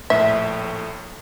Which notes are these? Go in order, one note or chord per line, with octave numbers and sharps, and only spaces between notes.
A#1 A2 A3 E5